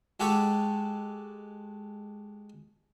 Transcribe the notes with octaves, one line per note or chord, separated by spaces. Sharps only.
G#3 G4 A4 F#5 C#6